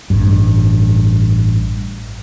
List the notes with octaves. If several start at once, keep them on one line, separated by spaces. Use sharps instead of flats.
A1 G2